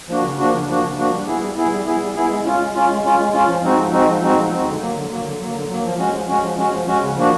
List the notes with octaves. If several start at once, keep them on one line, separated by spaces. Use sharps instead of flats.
F3 A#3 D4 F#4
C#3
F3 A#3 D4 F#4
C#3
F3 A#3 D4 F#4
C#3
F3 A#3 D4 F#4
G3
B3 E4 G#4
G3
B3 E4 G#4
G3
B3 E4 G#4
G3
B3 E4 G#4
G#3
C#4 F4
G#3
C#4 F4
G#3
C#4 F4
G#3
C#4 F4
F3
G#3 C4 D#4 F#4
F3
G#3 C4 D#4 F#4
F3
G#3 C4 D#4 F#4
F3
G#3 C4 D#4 F#4
D3
F#3 A#3
D3
F#3 A#3
D3
F#3 A#3
D3
F#3 A#3
F3
G#3 C#4 F#4
F3
G#3 C#4 F#4
F3
G#3 C#4 F#4
F3
G#3 C#4 F#4
C#3
F3 A#3 D4 F#4